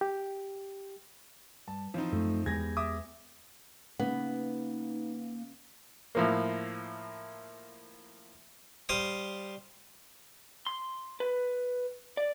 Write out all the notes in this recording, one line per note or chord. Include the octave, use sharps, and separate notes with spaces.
G4
G2 A5
E3 F3 C4 D#4
F#2 A3
E2 G#3 B3 G4 G#4 G#6 A#6
E5 D6 D#6
C#3 A#3 B3 D#4
A2 F3 A#3
G3 C5 F5 D#6
C6
B4
D5